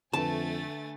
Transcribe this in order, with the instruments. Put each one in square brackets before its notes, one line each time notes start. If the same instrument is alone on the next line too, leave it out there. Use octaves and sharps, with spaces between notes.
[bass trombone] F2 [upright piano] D3 B4 [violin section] A3 G#5 A6 [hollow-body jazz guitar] A5